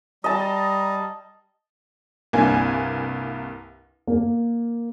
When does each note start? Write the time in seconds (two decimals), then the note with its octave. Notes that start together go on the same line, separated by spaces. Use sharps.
0.24 G3 D#5 A5 A#5
2.33 C2 G2 A#3 G#5
4.07 A#3